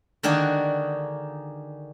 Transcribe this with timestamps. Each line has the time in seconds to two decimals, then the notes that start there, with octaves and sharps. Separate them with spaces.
0.23 D3 D#3 A#3 D4 F#4 G#4